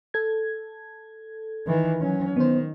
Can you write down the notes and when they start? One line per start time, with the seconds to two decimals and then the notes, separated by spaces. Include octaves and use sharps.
0.14 A4 G#6
1.67 D#3 E3
2.01 F#3 C#4
2.36 D#3 B3 C5